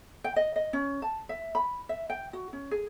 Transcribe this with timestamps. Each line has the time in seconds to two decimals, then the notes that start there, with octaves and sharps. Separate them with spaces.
0.24 G5
0.36 D#5
0.56 D#5
0.73 C#4
1.02 A5
1.29 E5
1.55 B5
1.89 E5
2.10 G5
2.33 F#4
2.53 C#4
2.71 G#4